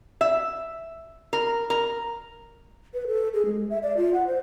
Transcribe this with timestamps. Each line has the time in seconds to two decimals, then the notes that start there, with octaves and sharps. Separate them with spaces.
0.21 E5
1.33 A#4
1.70 A#4
2.94 B4
3.07 A4
3.34 G#4
3.46 G#3
3.70 E5
3.83 D5
3.97 F4
4.14 F#5
4.27 C5